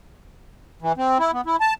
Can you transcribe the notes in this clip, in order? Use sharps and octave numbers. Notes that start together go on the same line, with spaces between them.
E3
C4
E4
B3
E4
A5